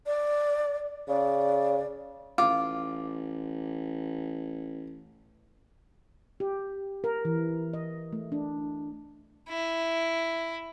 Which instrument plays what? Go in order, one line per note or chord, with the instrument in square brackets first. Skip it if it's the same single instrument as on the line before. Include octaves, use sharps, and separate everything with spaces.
[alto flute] D5
[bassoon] C#3 [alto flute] D5
[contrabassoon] A1 [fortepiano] F4 [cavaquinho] D6
[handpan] G4
A#4
E3
D#5
A3
D4
[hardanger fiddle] E4